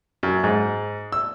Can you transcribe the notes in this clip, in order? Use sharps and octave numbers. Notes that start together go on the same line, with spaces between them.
F#2
G#2
E6